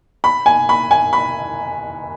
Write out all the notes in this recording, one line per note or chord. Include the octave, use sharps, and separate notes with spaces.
B5
G#5
B5
G#5
B5